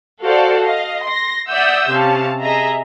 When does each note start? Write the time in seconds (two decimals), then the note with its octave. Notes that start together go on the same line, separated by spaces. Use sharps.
0.22 F#4 A4 C5 D5 F5
0.63 D#5 F5
1.04 C6 A#6
1.49 D5 E5 F#5 D#6 E6 G6
1.90 C3 C#4 F5 A5
2.41 G#4 D#5 E5 A#5